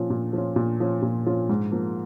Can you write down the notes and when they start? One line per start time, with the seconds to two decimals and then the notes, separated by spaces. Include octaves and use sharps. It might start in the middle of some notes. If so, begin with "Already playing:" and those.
Already playing: A#2 F3 C#4 F4
0.10 A#2
0.33 F3 C#4 F4
0.56 A#2
0.80 F3 C#4 F4
1.02 A#2
1.26 F3 C#4 F4
1.49 G#2
1.72 F3 A#3